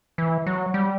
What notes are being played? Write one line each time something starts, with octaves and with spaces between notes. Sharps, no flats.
E3
F#3
G3